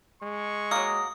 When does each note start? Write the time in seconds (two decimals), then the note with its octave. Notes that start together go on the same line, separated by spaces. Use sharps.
0.23 G#3 C#6
0.71 F#3 A#3 D#6